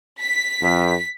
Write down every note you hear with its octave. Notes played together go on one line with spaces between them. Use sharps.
B6
F2